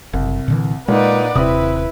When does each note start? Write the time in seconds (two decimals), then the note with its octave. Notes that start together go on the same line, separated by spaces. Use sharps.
0.13 F#1 C2
0.48 A#2 D3 E3
0.88 A#2 G#3 D#4 B4 D5 F#5
1.35 D#1 C3 C4 E4 B4 D#6